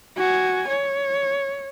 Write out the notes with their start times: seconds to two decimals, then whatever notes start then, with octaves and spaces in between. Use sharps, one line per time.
0.17 F#4 G#5
0.68 C#5